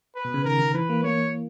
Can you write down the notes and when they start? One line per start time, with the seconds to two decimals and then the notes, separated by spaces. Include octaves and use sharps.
0.15 B4
0.25 B2
0.34 C#3
0.45 D#3 A#4
0.59 D#3
0.74 E3 B4
0.89 A#3
1.03 A#3 C#5